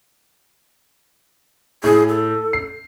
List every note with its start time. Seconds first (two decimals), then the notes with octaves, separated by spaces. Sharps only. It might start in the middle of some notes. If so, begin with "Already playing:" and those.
1.84 A2 G#4
2.08 A4
2.53 C7